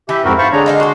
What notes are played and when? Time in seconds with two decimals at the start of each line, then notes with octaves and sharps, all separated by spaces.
0.09 E3 G4 E5
0.24 F2 G#2 C4 E4 F#4 A#4
0.38 C5 F5 A5 B5 C#6
0.52 D3 G#3 D4 C#5 A#5
0.66 D#4 A4 A#4 F5
0.80 F#4 A4 C6